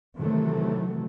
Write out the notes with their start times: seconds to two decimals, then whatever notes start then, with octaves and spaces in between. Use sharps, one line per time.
0.16 C3 D#3 E3 F#3 A3